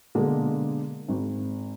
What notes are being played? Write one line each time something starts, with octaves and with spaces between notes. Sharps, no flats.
B2 D3 G#3 A#3 D4
G#1